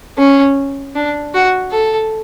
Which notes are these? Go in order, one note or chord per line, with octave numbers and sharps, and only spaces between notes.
C#4
D4
F#4
A4